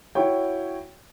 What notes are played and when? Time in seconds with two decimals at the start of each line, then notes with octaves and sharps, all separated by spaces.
0.15 E4 F#4 C#5 G5